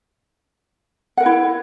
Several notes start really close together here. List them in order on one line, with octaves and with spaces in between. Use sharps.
F#5 A#4 B4 E4